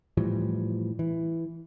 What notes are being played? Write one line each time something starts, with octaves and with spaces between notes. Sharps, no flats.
A2 E3 F3 G3
E3